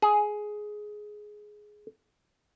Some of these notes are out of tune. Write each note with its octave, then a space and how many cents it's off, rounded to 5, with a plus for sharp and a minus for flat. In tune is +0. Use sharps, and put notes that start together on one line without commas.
G#4 +10